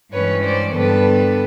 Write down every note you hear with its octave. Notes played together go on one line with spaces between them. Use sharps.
G2 E3 G#3 C#4 B4 C#5
C5 D5
G2 D3 G3 B3 A4 B4